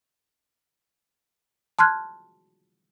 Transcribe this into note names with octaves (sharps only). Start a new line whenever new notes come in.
A5 C6 F6 F#6 G#6